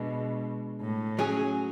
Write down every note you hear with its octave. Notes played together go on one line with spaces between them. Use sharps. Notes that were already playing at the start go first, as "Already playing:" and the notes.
Already playing: B2 G#3 D4
A2
F#3 C#4 G#4